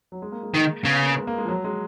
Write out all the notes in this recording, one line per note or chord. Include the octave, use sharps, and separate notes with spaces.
F#3
G#3
A#3
G#3
D#3
C#3 B3
A#3
G#3
A#3
G#3
F3
F#3
G#3